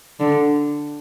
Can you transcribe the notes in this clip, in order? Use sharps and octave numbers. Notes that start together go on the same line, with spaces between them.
D3